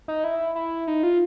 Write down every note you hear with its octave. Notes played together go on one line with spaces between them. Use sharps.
D#4
E4
E4
D#4
F4